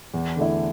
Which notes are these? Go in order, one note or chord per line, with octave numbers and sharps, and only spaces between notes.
E2
D3 A3 E4